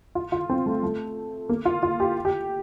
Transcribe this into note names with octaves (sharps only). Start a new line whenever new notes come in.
F4
F4
C4
A3
A3
A#3
F4
F4
G4
G4